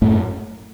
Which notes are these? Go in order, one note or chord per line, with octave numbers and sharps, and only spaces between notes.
F#2 A2 A3